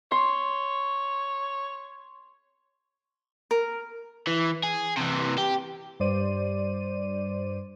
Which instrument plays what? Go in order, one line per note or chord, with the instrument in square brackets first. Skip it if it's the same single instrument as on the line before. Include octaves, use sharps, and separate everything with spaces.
[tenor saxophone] C#5 [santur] C6
[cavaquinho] A#4
[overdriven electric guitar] E3
G#4
C3 E3
G4
[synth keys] G2 C5 D5 D#7